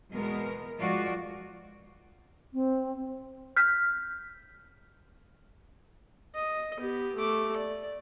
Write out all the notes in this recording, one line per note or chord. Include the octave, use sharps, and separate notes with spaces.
E2 B2 G#3 B3 A#4
F3 G#3 F4 F#4 D5
C4
F6 G6 B6
D#5
B3 G4
A3 D6
D5